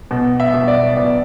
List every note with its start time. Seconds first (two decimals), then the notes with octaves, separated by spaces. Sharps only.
0.11 B2
0.40 E5
0.54 B2
0.68 D5
0.97 B2 D5